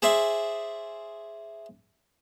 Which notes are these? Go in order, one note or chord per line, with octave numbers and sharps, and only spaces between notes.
G#4 C5 D5 E5 G#5